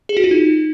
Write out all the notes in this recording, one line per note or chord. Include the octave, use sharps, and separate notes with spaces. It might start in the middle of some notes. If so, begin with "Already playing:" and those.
G#4
F#4
F4
D#4